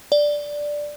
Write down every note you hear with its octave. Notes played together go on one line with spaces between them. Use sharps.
D5